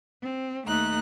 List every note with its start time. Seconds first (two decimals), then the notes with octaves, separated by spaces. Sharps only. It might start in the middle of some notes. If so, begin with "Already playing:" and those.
0.23 C4
0.67 D#2 A3 D#4 A#5 F#6